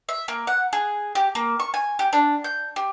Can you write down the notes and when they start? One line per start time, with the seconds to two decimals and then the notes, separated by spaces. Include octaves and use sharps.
0.09 E5
0.28 A#3
0.47 F#5
0.73 G#4
1.15 G4
1.35 A#3
1.60 C#6
1.74 G#5
1.99 G4
2.13 D4
2.44 G6
2.76 G4